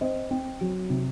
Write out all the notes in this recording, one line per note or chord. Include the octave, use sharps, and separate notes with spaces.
C4 C5 D#5
C4
F#3
C3